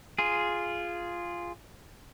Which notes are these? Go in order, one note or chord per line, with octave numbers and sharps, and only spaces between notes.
F4 G#4